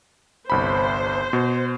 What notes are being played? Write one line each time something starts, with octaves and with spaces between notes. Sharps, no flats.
G1 C2 C5 B5
B2